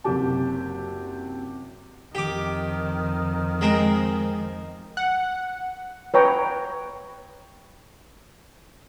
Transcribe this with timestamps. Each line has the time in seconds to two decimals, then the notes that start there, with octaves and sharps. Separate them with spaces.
0.04 F#1 C3 F#3 F#4 G4 A5
2.15 F2 D#3 G4 D6
3.61 G#3 C4 A#4
4.97 F#5
6.14 B4 C#5 G5 A#5